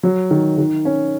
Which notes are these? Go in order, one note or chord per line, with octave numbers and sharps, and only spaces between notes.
F#3
D#3
D#3
C#4